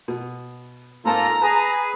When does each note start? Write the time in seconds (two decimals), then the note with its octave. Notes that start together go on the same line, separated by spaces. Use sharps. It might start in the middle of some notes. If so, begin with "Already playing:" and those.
0.08 B2
1.05 G#2 A#3 C4 F4 A4 A5 A#5
1.42 G#4 B4 A5